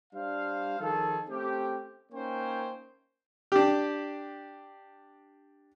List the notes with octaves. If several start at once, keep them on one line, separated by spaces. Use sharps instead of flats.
G3 D4 C5 F5
D#3 F3 G#4 A4
A3 C4 C#4 G4
A#3 C#4 D#4 C5 C#5 G5
D4 G4